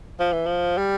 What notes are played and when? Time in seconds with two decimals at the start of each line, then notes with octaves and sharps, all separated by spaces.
0.19 F3
0.33 E3
0.46 F3
0.78 G3